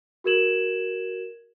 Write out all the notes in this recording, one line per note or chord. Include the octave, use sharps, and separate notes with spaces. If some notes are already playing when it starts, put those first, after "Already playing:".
F#4 G#4 A#4 G#6 E7 F#7